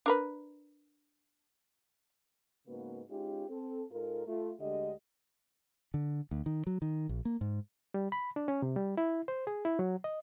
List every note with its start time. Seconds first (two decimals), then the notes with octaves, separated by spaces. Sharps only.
0.06 D4 A#4 B4
2.66 G#2 C#3 A#3 B3 F#4 B4
3.09 G#3 C#4 D#4 F4 G4
3.49 C4 A4
3.91 G#2 F4 A4 A#4
4.27 A3 F4
4.59 D2 D3 G#3 G4 D#5
5.94 D3
6.31 D2
6.46 D#3
6.67 F#3
6.82 D#3
7.09 A#1
7.25 A#3
7.41 G#2
7.94 G3
8.12 B5
8.36 D4
8.48 C#4
8.62 C3
8.76 G3
8.97 E4
9.28 C5
9.47 G#4
9.65 E4
9.79 F#3
10.04 D#5